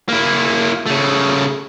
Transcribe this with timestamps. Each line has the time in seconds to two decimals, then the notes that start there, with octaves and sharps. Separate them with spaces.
0.09 A#3 E4
0.87 C#3 A3